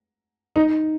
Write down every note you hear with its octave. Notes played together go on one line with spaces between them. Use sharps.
D#4